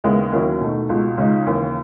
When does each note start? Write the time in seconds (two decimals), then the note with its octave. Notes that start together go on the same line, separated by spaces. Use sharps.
0.04 D#2 C#3 G#3 B3 E4
0.32 D#2 D#3 F#3 C#4 E4
0.61 B2 A3 D#4
0.89 C#2 B2 G#3
1.17 C#2 C#3 G#3 D#4
1.46 D#2 C#3 E3